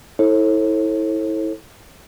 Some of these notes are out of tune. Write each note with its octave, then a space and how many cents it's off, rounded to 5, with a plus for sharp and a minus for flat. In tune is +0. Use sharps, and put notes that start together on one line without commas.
E4 -25 A4 +0 C#5 -45